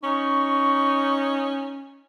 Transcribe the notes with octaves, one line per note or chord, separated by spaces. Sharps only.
C#4 D#4 C#6